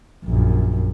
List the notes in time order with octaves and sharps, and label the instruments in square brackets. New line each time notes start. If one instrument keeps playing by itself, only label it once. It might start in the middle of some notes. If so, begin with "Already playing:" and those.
[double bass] A#1 F#2